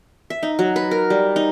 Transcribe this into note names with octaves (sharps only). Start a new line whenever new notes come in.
E5
D#4
F#3
B4
A#4
G3
D#4